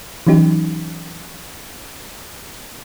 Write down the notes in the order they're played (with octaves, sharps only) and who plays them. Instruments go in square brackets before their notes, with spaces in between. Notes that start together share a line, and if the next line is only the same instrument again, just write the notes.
[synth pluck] E3 F#3 C#4 D#4 G4